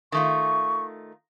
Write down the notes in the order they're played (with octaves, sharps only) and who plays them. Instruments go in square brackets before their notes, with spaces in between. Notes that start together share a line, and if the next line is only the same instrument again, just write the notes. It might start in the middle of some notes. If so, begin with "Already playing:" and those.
[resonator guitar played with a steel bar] D#3 A3 F4 [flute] C#6